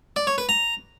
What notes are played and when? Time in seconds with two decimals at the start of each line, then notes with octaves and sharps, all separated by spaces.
0.16 D5
0.27 C#5
0.38 B4
0.49 A#5